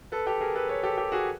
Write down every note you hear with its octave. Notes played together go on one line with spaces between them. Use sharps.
A4 B4
G4 A4
G#4 A#4
A4 B4
B4 C#5
G4 A4
G4
F#4 G#4